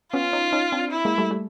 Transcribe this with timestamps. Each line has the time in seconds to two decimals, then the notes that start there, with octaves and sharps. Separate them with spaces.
0.13 B3 C#4 F4
0.33 C#4 D#4
0.52 C#4 D#4
0.72 C4 D4
0.92 E4
1.05 G#3 A#3
1.18 G3 A3
1.31 G3 A3